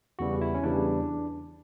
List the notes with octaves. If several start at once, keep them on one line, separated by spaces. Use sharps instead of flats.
E2 C#3 E3 G3 F#4
E4
C#4
E2 C#3 E3 G3 D4